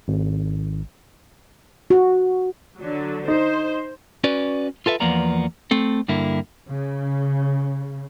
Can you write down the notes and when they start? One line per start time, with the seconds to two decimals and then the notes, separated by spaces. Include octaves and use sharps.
0.08 G#1
1.90 F#4
2.78 D3 F#3
3.28 D#4 C5
4.24 C#4 F#4 B4 D5
4.86 F4 A4 B4 E5
5.00 E2 F3 A#3 B3 D5 A#5
5.71 A3 C4 A4
6.08 G2 D3 A#3 E4
6.68 C#3